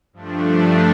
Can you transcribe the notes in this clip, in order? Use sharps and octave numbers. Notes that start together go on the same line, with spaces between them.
G2 F3 A3 D4